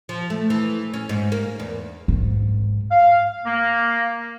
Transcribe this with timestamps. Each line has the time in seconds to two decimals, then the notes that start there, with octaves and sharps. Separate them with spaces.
0.09 F3
0.30 A3
0.50 E3
0.94 C#4
1.09 G#2
1.32 A#3
1.60 E2
2.08 G#2
2.91 F5
3.45 A#3